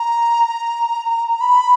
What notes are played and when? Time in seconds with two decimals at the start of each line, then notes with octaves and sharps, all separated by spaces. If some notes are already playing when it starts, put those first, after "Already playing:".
Already playing: A#5
1.41 B5